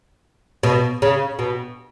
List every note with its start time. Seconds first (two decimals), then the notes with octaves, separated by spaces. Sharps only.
0.63 B2
1.02 C#3
1.39 B2